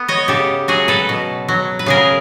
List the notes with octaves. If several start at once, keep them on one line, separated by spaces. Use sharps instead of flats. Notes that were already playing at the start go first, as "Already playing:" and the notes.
Already playing: B3
C#5 D#5
C#3 G4 A4
F#3 F#4 G#4
A4 B4
B2
F#3
B4
C#3 G#4 A#4